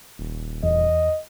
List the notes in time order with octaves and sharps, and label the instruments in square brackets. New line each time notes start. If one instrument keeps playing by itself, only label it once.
[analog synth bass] D#1
[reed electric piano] E2 [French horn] D#5